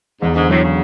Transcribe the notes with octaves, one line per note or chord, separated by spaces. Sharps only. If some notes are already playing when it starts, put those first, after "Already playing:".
E2 G#2
G#2 D3
A2 F#3
C#3